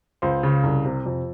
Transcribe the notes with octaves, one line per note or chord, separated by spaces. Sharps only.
C#2 C5
C#3
C2
C3
F2